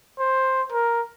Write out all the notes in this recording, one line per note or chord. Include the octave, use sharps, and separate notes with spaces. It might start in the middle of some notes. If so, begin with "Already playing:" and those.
C5
A#4